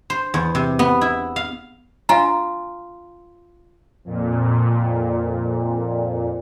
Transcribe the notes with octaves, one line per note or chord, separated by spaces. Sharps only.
C5
E2
C3
B3
E4
F5
F4 F5 G#5 A#5
F2 A#2